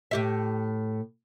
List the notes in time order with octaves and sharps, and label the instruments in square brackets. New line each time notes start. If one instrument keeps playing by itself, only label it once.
[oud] A2 G4 E5